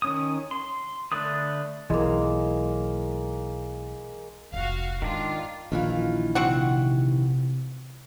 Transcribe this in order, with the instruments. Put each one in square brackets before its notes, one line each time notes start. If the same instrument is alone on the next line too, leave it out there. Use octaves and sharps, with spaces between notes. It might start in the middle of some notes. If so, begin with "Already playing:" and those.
[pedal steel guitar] D#3 C#4 D#6
C6
D3 A3 D4 B4 D#6
[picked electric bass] B1 E3 [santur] G#3 A#3
[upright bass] F1 C#2 [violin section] F#4 F5
[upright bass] G#2 [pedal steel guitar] D#3 D4 [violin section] F4
[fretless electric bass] A#1 [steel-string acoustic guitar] D#3 E3 F4
[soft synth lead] C3 [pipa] C4 F#4 F#5